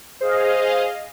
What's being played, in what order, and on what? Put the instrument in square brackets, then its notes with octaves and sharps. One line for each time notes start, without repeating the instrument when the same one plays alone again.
[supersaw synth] G#4 D#5 F5 [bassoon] C5